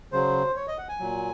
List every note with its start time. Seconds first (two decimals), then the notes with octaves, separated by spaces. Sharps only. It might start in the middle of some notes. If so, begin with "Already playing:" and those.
0.12 C#3 F#3 C5
0.56 C#5
0.68 D#5
0.78 F#5
0.89 G#5
1.00 A#2 F#3